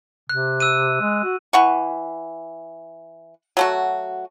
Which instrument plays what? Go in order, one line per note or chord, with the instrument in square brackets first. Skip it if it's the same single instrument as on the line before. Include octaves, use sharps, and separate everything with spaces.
[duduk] C3 [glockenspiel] F#6
[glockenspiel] E6 F#6 D#7
[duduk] G#3
F#4
[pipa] E3 F#5 C#6
F#3 A3 F#4